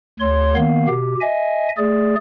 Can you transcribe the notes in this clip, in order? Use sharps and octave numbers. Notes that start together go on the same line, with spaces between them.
D2 C#5 C6
D#3 A#3 B3 F5
B2 G4
D#5 E5 G#5
A3 G#4 D5